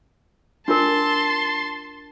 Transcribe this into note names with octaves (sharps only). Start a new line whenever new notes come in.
D4 F4 A#4 A5 C6